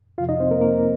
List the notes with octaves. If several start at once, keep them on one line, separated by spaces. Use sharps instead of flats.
F2 C3 F3 F4 F5
D#4 D#5
C4 C5
A#3 A#4
A#3 A#4